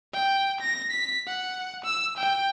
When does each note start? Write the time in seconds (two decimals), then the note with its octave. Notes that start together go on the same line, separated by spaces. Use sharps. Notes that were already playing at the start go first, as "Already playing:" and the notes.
0.14 G5
0.61 A#6
0.91 B6
1.27 F#5
1.85 E6
2.18 G5